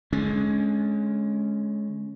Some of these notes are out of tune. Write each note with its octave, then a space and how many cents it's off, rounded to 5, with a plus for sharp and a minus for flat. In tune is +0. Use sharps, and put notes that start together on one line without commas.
D3 +0 G#3 +25 C#4 +0